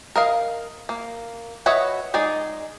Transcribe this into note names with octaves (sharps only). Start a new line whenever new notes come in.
A#4 D#5 F5
A#3
F#4 B4 C#5 D#5 E5
G#3 D#4 G#4 D5